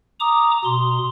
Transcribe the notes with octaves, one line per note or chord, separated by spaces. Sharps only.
A#5 D6 D#6
B2 C6